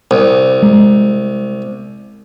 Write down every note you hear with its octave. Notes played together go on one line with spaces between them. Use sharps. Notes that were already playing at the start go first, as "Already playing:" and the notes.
C2
G#3